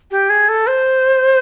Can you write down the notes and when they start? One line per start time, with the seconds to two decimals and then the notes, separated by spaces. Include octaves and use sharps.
0.11 G4
0.29 G#4
0.48 A4
0.67 C5